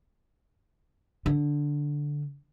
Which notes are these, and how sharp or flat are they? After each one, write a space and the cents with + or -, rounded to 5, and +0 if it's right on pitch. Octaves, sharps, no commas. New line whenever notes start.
D3 -5